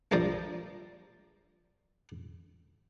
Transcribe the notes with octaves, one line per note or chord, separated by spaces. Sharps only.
A#1 F3 G4 A#4 D5